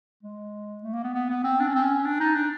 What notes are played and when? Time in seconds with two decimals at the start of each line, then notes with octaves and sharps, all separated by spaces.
0.23 G#3
0.83 A3
0.93 A#3
1.04 B3
1.14 B3
1.30 B3
1.44 C4
1.60 D4
1.68 C#4
1.75 C4
1.83 C#4
2.05 D4
2.20 D#4
2.35 D4